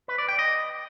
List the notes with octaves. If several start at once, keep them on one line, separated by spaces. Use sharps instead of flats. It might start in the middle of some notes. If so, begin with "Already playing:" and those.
B4
D5
G5
D#5